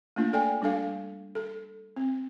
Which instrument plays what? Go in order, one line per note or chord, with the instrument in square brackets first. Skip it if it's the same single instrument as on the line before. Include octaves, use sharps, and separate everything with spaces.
[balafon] A3 A#3 D4 F4
A4 D5 G5 G#5
G3 D4 A4 F5
A4
C4